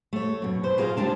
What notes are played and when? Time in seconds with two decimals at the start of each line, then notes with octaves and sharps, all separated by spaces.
0.13 A3 C#5
0.42 F#2 B2
0.63 B4 C5
0.77 F4 G#4 A#4 E5 F5
0.97 D#2 G3 G#3 D4 A5